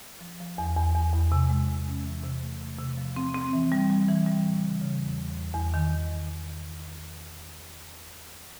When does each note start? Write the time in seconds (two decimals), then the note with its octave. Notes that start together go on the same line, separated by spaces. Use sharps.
0.21 F3
0.40 F3
0.58 E2
0.76 E2
0.94 E2
1.13 E2
1.32 C3
1.49 G#3
1.69 G#3
1.88 C#4
2.05 E3
2.24 C3
2.42 A3
2.61 C3
2.79 C3
2.98 F3
3.16 C4
3.34 C4
3.53 E3
3.72 G3
3.90 G3
4.08 E3
4.26 G3
4.45 A2
4.63 C#3
4.82 C#3
5.01 E2
5.18 E2
5.37 E2
5.55 E2
5.74 D#3